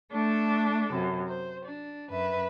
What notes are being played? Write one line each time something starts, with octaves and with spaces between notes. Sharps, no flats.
A3 D4 A4
F#2 C3
C5
D4
F#2 B4 E5